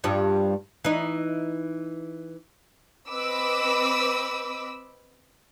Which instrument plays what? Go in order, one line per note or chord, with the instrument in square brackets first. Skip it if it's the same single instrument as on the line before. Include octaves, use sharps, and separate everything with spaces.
[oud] G2 F3
E3 D#4
[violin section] C4 B4 D#5 B5 D6 E6